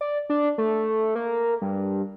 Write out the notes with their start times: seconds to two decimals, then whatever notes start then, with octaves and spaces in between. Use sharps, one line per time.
0.01 D5
0.30 D4
0.58 A3
1.15 A#3
1.62 G2